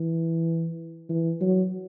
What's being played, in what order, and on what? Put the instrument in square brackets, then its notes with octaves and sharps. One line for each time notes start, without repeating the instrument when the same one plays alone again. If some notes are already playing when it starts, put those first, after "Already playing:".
Already playing: [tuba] E3
E3
F#3